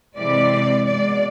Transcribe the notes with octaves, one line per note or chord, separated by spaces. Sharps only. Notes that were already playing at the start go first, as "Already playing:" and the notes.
C3 E3 G#3 D5
B2 G#3 D5